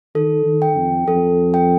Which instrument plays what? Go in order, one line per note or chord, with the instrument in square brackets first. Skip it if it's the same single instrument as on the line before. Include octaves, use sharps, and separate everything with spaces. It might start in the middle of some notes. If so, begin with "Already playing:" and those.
[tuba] D#3 [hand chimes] A4
[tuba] D#3
[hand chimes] G5
[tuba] F2
[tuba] F2 [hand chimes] A4
[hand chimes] G5